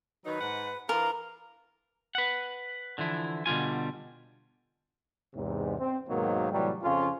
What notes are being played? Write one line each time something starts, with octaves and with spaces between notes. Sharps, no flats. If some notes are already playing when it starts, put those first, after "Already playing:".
D#3 F#3 D#4 B4
G#2 F#5
E3 D4 F4 A#4 A#5
B4 F#5
D3 E3 F3 E4
B2 D3 G3 F4 G#5
E2 G#2 C3
C4
D#2 G#2 B2 D#3 F#3 A#3
A2 C3 E3 F#3 G3
F2 C#3 F3 C#4 F4